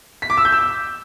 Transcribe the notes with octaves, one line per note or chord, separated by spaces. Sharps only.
B6
D6
E6
G6
E6